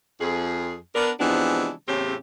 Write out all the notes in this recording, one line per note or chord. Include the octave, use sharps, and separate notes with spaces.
F2 G#4
B3 D4 A#4
C3 E3 F3 G#3 B3 D4
E2 A2 C#3 C4 C#4 G4